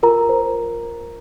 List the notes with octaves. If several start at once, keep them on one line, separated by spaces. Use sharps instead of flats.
F4 A#4 A#5
C5